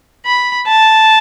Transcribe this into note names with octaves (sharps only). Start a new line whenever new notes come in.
B5
A5